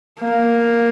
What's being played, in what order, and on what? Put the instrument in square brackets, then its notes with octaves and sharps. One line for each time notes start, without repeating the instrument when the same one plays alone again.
[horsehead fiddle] A#3